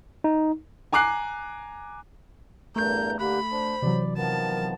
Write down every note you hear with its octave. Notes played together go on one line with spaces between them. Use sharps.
D#4
G#5 A#5 D6 F#6 C7
E2 G2 A3 A#4 A#5 G6
D3 A#3 G4 B5 F#6
D4 C5
C3 E3 F#3 D5
D#3 F3 B3 A#4 A5